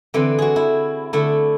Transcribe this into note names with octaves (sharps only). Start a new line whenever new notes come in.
D3 E3 C4
F#4 G#4
E4
D3 A3 E4